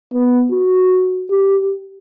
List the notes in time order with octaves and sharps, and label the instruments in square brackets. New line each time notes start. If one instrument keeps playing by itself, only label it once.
[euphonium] B3
F#4
G4